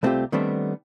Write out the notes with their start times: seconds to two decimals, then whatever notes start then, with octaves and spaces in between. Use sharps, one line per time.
0.03 C2 A3 C4 E4 F4 G4
0.32 D#3 G3 A3 B3 C4 D4